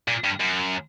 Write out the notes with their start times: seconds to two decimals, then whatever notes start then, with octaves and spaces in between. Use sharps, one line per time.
0.08 A#2
0.24 G2
0.40 F#2